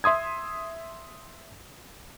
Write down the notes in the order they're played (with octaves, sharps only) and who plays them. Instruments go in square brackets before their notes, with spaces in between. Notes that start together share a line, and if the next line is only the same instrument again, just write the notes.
[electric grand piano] E5 C6 D#6 G#6